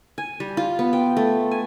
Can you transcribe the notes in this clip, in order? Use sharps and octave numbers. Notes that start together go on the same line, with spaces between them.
G#5
G3
F4
B3
G5
A3
G#5